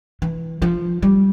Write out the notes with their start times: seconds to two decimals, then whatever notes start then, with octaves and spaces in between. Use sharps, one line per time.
0.22 E3
0.62 F3
1.02 G3